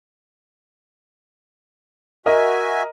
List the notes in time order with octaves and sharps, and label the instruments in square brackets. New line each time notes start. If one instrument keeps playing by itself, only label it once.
[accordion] F#4 E5 G#5 [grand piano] A#4 D#5